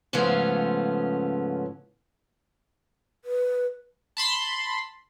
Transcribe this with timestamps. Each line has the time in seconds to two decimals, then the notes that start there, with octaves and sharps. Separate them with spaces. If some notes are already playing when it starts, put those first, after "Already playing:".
0.13 G#2 C#3 F3 A3 B3 C#4
3.25 B4
4.17 A5 B5 C6